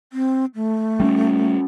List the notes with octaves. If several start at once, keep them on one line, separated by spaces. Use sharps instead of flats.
C4
A3
G3 C4 C#4